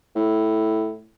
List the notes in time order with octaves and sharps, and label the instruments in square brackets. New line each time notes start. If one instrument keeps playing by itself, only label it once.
[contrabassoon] A2